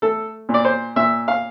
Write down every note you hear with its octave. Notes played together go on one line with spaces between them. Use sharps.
A3 A4
A#2
D5
C5
A#2 E5
F5